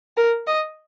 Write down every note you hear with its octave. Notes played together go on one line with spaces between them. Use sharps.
A#4
D#5